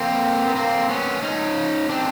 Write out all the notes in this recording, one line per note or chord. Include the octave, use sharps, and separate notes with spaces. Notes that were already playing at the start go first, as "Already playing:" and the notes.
Already playing: A#3 C4
B3
A#3 C4
B3 C#4
C#4 D#4
C4 D4